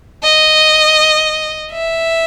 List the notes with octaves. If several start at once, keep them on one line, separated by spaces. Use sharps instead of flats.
D#5
E5